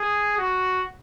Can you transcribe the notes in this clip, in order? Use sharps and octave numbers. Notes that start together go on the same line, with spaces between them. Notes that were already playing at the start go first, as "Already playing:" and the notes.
Already playing: G#4
F#4